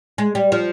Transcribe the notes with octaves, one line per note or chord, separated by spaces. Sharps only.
G#3
G3
F3